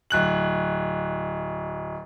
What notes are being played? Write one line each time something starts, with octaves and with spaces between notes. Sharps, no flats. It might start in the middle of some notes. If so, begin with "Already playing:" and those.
D1 F#6 F#7